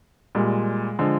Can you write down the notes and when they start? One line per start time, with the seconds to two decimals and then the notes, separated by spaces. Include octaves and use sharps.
0.35 A#2 G3 G#3
0.99 D3 F3 G#3